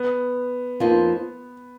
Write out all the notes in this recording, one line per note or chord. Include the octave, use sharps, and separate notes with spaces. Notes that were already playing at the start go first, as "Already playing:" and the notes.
Already playing: B3
F2 F3 A#3 D#4